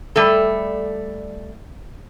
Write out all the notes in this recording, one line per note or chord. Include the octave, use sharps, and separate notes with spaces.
G3 A3 A4